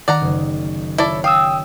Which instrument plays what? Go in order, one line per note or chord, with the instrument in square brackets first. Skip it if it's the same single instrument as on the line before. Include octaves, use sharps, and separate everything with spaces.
[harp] D#3 [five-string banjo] D5 F#5 A#5
[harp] F#1
[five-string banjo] E4 A4 D5 [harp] C#5
[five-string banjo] F5 [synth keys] G5 D#6 E6